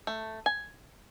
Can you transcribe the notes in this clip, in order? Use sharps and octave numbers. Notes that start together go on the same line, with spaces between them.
A3
G#5